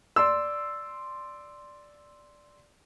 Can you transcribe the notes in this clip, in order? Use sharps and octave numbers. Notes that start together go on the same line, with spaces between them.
D5 C6 E6